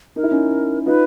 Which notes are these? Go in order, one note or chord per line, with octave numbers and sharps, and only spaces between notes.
D#4 A#4
E4
C#4 D#4
D#4 F4 B4